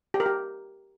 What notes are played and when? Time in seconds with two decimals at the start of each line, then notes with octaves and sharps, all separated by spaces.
0.14 G4
0.20 A#4
0.26 G4